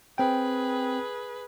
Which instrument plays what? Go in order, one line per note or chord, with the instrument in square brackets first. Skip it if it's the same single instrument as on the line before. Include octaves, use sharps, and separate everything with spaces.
[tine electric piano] C4 G5 [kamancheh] G#4 B4